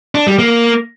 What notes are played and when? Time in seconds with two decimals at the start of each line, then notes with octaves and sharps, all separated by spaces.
0.15 D4
0.27 G3
0.39 A#3